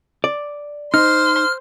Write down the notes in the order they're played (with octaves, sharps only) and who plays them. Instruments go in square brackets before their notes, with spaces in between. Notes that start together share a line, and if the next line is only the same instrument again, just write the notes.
[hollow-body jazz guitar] D5
[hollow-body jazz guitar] D#4 [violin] C5 C6 [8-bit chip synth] F6